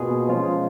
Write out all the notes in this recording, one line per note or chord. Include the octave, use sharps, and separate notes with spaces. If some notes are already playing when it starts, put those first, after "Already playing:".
Already playing: B2 A#3 F4 G#4
F3 G#3 C#4 F4